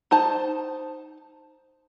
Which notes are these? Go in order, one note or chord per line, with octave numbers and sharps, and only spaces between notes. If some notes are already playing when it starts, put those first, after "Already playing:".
D#4 C5 A5